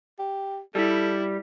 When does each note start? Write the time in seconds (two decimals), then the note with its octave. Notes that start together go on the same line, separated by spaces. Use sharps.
0.19 G4
0.75 G3 E4 A4